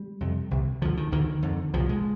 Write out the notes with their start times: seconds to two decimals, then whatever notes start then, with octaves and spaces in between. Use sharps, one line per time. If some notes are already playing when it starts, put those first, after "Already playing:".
Already playing: G3
0.21 F2 C3
0.51 C2 C3
0.82 D2 D3 F3
0.97 D#3
1.12 D2 D3 D#3
1.43 F2 D3
1.74 C2 A#2 F3
1.89 G#3